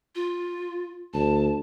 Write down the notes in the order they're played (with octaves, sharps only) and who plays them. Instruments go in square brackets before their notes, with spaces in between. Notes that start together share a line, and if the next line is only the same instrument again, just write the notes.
[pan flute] F4
[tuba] D2 [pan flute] A5